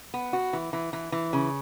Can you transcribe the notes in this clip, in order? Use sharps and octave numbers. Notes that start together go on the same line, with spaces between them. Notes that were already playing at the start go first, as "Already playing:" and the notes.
B3
F#4
E3
E3
E3
E3
C#3